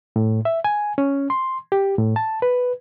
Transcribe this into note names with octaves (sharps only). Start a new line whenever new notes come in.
A2
E5
G#5
C#4
C6
G4
A2
A5
B4